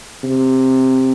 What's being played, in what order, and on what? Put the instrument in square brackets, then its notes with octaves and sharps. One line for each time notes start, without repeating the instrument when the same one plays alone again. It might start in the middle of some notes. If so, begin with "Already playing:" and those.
[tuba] C3